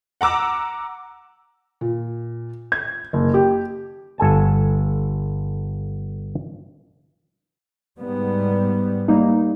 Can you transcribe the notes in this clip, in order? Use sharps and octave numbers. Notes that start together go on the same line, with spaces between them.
F#5 A#5 D6 E6
A#2
G#6
F#1
G4
G1 A4 G#5 A5
G#2 G3 B3
G3 A#3 D#4